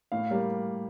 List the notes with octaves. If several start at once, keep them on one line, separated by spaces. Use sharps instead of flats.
A2 F5
G3 A#3